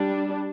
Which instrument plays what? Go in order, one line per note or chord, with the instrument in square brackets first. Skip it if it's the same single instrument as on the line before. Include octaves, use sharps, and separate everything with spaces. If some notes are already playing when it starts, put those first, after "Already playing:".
Already playing: [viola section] G3 D4